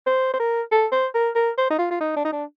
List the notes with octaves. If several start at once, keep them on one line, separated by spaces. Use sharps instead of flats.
C5
C5
A#4
A4
C5
A#4
A#4
C5
D#4
F4
F4
D#4
D4
D#4
D4